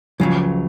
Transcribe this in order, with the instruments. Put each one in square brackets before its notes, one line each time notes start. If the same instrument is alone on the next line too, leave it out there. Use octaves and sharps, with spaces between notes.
[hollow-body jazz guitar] C#2 C#3 F#3 [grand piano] F3